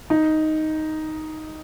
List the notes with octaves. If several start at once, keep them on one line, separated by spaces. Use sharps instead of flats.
D#4